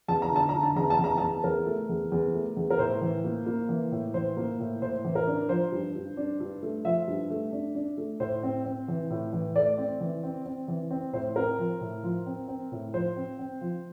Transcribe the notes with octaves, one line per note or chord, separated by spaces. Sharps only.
E2 A5
A#5
D3
A5
D3 A#5
A5
E2 A#5
A5
E2
A#5
E2 A5
E2 A#4
A3
E2
E2
A3
E2
A#4
A2 C5
E3
A#3
A#3
E3
A2
E3 C5
A#3
A2
A2 C5
E3
A#4
D4
F3 C5
G2
G2
D4
G2
A3
F3 E5
G2
A3
D4
D4
A3
A2 C5
C4
C4
E3
A2
E3
A3 D5
C4
E3
C4
C4
E3
C4
A2 C5
C4 A#4
F3
A2
F3
C4
C4
A2
F3 C5
C4
C4
F3